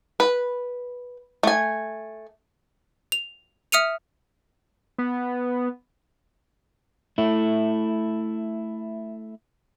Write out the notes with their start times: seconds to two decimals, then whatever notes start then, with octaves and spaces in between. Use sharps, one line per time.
0.20 B4
1.43 A3 G#5
3.12 F7
3.72 E5 D#6 F6 C#7 D#7 F7
4.98 B3
7.18 A3 E4